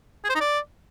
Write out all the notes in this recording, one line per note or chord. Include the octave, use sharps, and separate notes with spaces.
G#4
C5
D#4
D5